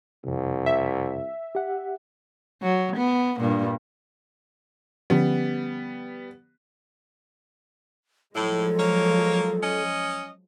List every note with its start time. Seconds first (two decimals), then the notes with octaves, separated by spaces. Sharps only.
0.24 C2 F2 C3
0.66 E5
1.55 G4 F#5
2.62 F#3
2.97 B3
3.40 G2 A#2
5.10 D3 F3 G3 B3 C#4
8.35 A2 F3 F#3 G#3 A4
8.78 A#3 A#4 C#5
9.62 C#4 D#5